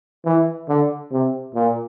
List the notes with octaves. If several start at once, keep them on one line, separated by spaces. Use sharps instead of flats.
E3
D3
C3
A#2